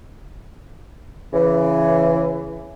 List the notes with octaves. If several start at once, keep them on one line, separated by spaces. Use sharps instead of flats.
C#3 E3